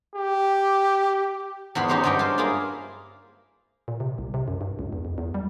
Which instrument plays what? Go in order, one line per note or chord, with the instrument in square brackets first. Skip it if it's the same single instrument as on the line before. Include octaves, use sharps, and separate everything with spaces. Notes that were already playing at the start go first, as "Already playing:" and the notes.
[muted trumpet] G4
[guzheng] E2 G#2 B3 B5 C6
C#4 D#4 G4 C5 C#5
G2 F#3 G#3 C#4 G4 G5
F4 C5
A#3 E4 F4 G#4
[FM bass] A#2
C3
C2
C3
F#2
G2
C#2
E2
F2
E2
G3